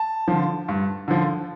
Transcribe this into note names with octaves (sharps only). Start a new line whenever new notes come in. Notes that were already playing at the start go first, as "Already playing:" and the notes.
Already playing: A5
D3 F3
G2
D3 F3